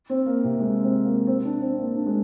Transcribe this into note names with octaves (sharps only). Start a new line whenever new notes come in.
C4
A#3
C3
G#3
C4
A#3
C4
D4
C4
C4
A#3
D4
G#3